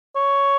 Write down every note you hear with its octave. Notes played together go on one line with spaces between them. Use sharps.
C#5